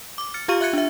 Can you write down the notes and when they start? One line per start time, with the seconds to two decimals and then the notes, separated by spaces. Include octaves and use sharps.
0.18 D6
0.34 F6 A6 C#7
0.48 F4 G4 F5 C#6 F6 D#7
0.61 E5 F#6 G#6 C#7
0.73 D4 E5